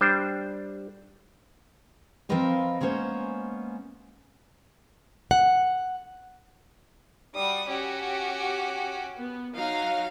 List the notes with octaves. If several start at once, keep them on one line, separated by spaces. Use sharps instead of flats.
G3 D4 C5
F3 C4 A#4 B4 D#5 F5
G#3 A#3 B3 C#4 C5
F#5
G3 F#4 D#6
C#4 F#4 G4
B3
F#3 D#4 F5